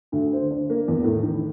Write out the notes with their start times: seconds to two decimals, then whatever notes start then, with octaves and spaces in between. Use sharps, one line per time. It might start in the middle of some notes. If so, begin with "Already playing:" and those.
0.12 D2
0.32 C5
0.51 D4
0.70 A#3
0.88 E2
1.04 A2
1.23 D#3